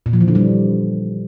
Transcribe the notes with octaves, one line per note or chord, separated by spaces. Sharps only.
A#2
F3
E3
D3
G3